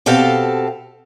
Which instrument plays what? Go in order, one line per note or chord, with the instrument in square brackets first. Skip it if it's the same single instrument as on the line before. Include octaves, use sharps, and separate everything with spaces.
[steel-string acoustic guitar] B2 C4 G4 A4 F5 A5